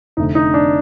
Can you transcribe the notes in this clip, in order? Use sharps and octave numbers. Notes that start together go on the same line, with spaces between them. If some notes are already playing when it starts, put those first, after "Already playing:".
F1 F2 D3 A3 D#4
D#4
D4